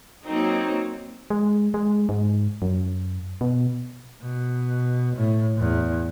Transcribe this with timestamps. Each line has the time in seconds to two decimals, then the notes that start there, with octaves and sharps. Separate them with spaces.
0.24 F#3 A#3 C4 D#4
1.30 G#3
1.74 G#3
2.09 G#2
2.62 F#2
3.41 B2
4.22 B2
5.16 A2
5.58 E2